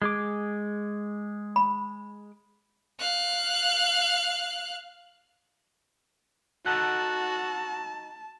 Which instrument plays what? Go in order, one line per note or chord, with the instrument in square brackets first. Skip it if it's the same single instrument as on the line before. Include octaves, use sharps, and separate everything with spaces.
[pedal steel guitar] G#3 G#4 D6
[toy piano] B5
[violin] F5 F#6
[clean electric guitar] D#4 A4 F#5 [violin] F#4 [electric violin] A5